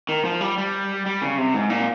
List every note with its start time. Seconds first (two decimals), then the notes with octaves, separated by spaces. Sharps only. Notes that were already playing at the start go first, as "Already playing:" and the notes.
0.09 D#3
0.25 F3
0.41 G3
0.58 G3
1.06 G3
1.21 C#3
1.38 C3
1.54 G#2
1.70 A#2